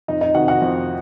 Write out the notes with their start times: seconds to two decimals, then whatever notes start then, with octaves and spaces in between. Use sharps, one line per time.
0.08 F2 D#4 D#5
0.21 D#4 D#5
0.34 C3 D#3 F#4 F#5
0.48 F#4 F#5
0.62 F2